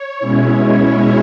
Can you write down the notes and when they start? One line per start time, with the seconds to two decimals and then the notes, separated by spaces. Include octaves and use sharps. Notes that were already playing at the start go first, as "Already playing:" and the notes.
Already playing: C#5
0.19 B2 G#3 C#4 E4